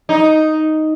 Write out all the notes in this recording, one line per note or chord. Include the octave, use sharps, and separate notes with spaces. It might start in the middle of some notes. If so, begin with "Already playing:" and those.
D#4